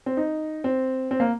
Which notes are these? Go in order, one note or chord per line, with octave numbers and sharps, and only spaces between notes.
C4
D#4
C4
C4
A#3